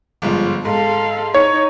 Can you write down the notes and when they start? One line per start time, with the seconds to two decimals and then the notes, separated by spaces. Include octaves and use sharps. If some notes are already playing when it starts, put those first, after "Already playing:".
0.22 G1 G#2 F3
0.65 G#2 A4 F5
1.34 D#4 C#5